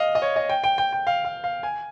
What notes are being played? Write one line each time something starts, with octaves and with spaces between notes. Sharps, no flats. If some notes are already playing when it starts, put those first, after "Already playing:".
Already playing: D#5 F5
D#5
C#5
D#5
G5
G5
G5
G5
F5
F5
F5
G#5